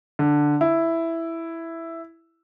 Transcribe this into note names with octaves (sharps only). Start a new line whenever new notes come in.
D3
E4